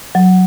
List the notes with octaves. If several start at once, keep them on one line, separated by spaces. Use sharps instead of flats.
F#3